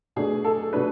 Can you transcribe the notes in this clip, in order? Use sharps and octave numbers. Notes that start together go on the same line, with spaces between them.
B2 A3 D4 G#4
A4
B2 A3 D4 B4